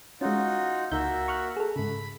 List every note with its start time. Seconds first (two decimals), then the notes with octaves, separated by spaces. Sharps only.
0.21 G#3 C#4 D#4 F4 F#4
0.92 C#2 A#3 D#4 F#4 E5 G6
1.28 C#6 F6 F#6
1.57 G#4 A4
1.76 G#2 C#3 B5